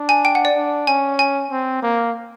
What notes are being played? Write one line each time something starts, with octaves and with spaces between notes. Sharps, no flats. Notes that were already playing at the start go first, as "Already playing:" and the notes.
Already playing: D4
G#5
G5
F#5
D5
D4
C#4 G#5
G#5
C4
A#3